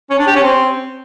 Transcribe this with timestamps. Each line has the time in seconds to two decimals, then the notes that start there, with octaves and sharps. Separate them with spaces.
0.10 C#4
0.19 D4
0.27 G4
0.35 C#4
0.43 C4